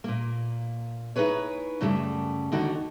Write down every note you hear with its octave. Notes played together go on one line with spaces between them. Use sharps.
A#2 A#3
D#4 E4 G#4 B4 C#5
F#2 C#3 G3 A3
D#2 D3 D#4 F#4